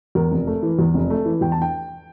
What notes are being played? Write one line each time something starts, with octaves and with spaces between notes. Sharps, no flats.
E2 A#4
F1
A3
E3
E2
F1
A3
E3
E2 G5
A5
G5